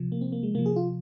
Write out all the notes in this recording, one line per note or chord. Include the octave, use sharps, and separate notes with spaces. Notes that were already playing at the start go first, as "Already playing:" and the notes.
Already playing: C3 F3
A#3
C4
A#3
G#3
C3 F3 A#3
G#4
F4